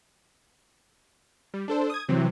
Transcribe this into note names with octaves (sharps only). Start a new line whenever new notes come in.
G3
D4 A4 C5
D#6 G#6
C3 E3 F#3 C4